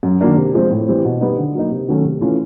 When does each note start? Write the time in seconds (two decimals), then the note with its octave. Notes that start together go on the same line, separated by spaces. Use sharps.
0.03 F#2
0.21 D#3 F#3 A#3 D4
0.37 C3
0.54 F3 G#3 C4
0.70 A2
0.88 E3 G3 C4
1.05 B2
1.21 G3 B3 D#4
1.38 D3
1.55 F#3 A#3 D#4
1.71 C3
1.89 D#3 F#3 A3 C#4
2.04 C3
2.21 E3 A3 C#4 F4